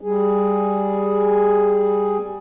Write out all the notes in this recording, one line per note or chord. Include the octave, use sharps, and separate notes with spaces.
G3 G#4